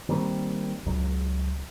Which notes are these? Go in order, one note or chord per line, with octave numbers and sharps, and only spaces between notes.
D#3 G3 A#3 C4
C#2 F#3